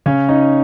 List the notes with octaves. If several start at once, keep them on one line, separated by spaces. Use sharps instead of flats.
C#3 C#4 C#5
C#4 D#4 D#5